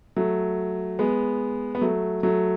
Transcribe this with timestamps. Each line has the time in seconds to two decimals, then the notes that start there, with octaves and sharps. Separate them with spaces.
0.16 F#3 A3
0.99 G#3 B3
1.75 B3
1.81 F#3 A3
2.23 F#3 A3